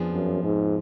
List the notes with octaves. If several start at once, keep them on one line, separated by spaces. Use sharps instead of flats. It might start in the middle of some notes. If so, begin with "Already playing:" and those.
Already playing: F2 F3 B3 D4 G#4
F#2
G#2